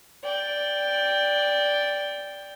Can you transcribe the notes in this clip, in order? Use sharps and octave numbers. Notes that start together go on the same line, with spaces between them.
D5 G5